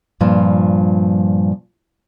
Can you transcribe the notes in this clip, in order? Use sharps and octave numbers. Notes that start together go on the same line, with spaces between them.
G2 A#2 F3